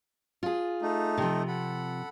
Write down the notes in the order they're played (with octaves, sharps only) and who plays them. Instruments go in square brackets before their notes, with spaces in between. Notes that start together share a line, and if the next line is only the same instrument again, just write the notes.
[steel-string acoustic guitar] F4 G#4
[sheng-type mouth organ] A3 D#4
[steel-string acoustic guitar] C3 F3
[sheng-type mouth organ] A4 F#5 B5